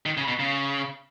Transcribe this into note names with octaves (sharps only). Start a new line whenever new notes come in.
D#3
C#3
B2
C#3